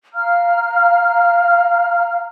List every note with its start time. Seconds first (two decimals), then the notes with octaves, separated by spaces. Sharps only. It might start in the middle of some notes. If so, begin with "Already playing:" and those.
0.14 F5 A#5 F6